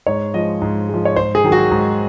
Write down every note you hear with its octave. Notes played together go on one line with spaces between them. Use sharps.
G#2 C#5
F3 G#3 D#5
G#2
F3 G#3
C#5
G#2 C5
G#4
D#3 F#3
F#4
G#2